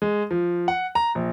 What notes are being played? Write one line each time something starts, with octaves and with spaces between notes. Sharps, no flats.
G#3
F3
F#5
A#5
A#1